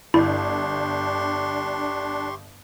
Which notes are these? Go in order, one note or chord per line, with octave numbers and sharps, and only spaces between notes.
G1 D4 E4 G4 C6 C#6